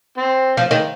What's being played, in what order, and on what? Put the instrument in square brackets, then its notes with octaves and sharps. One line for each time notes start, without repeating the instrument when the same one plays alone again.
[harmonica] C4
[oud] F3
D#3